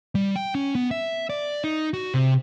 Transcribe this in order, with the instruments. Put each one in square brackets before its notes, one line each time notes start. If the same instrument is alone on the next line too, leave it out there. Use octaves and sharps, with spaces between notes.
[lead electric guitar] G3
G5
C#4
B3
E5
D5
D#4
F#4
C3